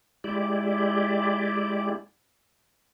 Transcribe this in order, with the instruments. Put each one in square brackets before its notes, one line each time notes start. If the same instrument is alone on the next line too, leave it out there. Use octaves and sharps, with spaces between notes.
[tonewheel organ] G#3 E4 G4 D5